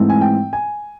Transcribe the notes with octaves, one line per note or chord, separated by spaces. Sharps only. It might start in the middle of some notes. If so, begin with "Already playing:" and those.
Already playing: G#2 E3 A3 C4
G#5
G5
G#5